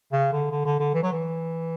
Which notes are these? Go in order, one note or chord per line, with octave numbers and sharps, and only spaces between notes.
C#3
D3
D3
D3
D3
E3
F#3
E3